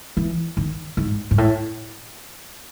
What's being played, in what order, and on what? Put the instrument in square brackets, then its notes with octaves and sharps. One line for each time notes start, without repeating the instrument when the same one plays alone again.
[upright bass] E3
D#3
G#2
G#2
A2